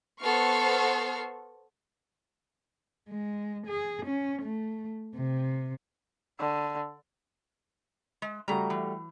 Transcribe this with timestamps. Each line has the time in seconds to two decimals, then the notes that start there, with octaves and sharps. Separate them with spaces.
0.22 B3 A4 C5 C#6 F6 C7
3.09 G#3
3.67 G#4
4.06 C#4
4.42 A3
5.16 C3
6.40 D3
8.22 G#3
8.48 C#3 G3 A3 F#4 A#5
8.70 E3